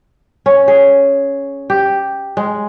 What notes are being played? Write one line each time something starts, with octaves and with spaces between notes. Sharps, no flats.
C#4
G#4
G4
G#3